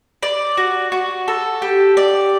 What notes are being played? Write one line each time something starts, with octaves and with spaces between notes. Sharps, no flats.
D5
F#4
F#4
A4
G4
D5